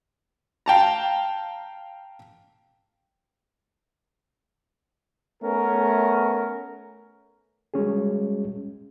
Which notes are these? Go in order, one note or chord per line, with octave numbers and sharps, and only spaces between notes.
F5 G5 A5 A#5
A3 B3 C#4 A#4
G3 G#3 C#4 F#4 G#4